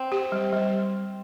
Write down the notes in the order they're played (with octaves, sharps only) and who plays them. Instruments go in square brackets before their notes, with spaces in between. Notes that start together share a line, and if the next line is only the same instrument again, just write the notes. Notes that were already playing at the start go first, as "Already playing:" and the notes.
Already playing: [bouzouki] C4
[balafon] G4
G3
G3